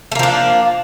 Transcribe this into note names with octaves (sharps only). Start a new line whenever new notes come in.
F3 A3 A#3 D4